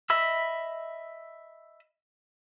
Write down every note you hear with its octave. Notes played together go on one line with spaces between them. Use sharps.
D#5 E5 B5 E6